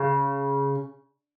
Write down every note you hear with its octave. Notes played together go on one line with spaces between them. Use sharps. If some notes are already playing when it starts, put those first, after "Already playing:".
Already playing: C#3